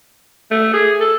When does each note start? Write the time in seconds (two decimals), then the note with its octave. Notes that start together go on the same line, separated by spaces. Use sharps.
0.51 A3
0.73 G#4
1.00 A4